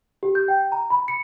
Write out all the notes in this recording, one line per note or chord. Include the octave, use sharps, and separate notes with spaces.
G4
G6
G5
A#5
B5
C#7